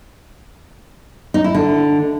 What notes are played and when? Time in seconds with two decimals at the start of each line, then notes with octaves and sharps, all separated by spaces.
1.34 D#4
1.44 E4
1.54 D3